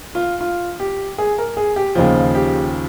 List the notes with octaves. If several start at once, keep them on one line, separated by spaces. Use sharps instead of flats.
F4
F4
G4
G#4
A#4
G#4
G4
D#2 C#3 F3 F4
G4